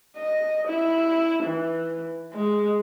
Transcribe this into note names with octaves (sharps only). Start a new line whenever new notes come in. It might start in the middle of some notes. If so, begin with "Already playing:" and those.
D#5
E4
E3
G#3